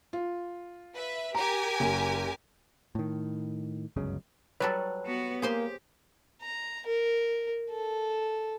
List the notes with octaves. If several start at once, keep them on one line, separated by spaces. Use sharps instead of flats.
F4
B4 E5
G4 A#4 G#5 A#5
F#1
A2 D#3
G1 C#2 F#2 C#3
F#3 G3 A4 B4 C#5 F#6
B3 F#4
A#3 G4 G#4 C5 C6
A#5
A#4
A4